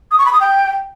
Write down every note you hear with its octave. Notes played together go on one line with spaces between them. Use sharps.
D#6
C#6
B5
D#6
G5